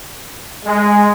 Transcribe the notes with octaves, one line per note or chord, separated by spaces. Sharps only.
G#3